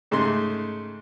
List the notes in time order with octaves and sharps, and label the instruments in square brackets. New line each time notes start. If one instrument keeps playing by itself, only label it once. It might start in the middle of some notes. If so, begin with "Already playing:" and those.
[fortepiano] G#2 C#3 A3 C6